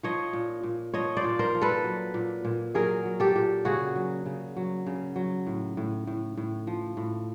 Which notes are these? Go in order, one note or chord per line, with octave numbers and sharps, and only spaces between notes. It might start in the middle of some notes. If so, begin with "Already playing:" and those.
F3 C#5 D#5
A#2
A#2
F3 C#5 D#5
C5 D5
A#2
A#4 C5
F3
A4 B4
F#3
A#2
A#2
F#3 G#4 A#4
F#3
G4 A4
A#2
C#3 F#4 G#4
F#3
C#3
F#3
C#3
F#3
A2
A2
A2
A2
F3
A2